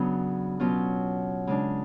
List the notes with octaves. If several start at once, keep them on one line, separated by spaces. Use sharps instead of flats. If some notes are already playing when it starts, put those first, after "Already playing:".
Already playing: C#3 F#3 B3 D4
B2 F#3 C#4 F4
C#3 G#3 D4